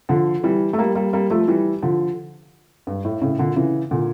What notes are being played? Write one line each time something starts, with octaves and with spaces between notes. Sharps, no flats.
D3 F3
E3 G3
A3
G3 A#3
G3 A#3
G3 A#3
F3 A3
E3 G3
D3 F3
G2
A2
A2 C#3
A#2 D3
C#3 E3
A#2 D3